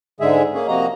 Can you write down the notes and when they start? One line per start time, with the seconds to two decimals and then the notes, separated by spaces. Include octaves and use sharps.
0.20 G#2 D3 G#3 G#4 E5
0.54 A#3 C#4 G#4
0.68 C3 F3 A#3 F#4 D#5 A#5